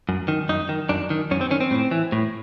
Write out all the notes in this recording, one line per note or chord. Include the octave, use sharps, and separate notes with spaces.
F#2
D#3
F#2 D#4
D#3
F#2 D4
D#3
F#2 C#4
C4
D#3 C#4
C4
A2
E3
A2